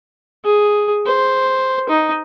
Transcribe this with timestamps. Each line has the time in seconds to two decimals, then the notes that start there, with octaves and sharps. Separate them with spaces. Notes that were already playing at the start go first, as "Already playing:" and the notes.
0.45 G#4
1.06 C5
1.90 D#4